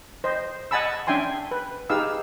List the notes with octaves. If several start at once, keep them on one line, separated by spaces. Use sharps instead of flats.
C5 D#5
D#5 F#5 G#5 A5 B5 E6
C#4 D4 E5 G5 G#5 C6
B4
D#4 G4 G#4 B4 F5 E6